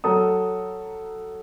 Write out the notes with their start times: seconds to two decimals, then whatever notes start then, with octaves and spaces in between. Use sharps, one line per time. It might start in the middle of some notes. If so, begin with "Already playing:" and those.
0.04 F#3 A4 A#5 D#6